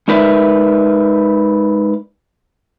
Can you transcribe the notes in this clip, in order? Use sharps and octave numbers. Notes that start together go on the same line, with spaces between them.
G#3 D#4 A#4 B4 D5 E5